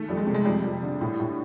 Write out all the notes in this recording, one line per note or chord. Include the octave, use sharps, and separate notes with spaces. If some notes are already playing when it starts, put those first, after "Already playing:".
Already playing: D#3 A3
F2 G3
G#3
C3
G#3
F2 G3
F2
D3
A2
A2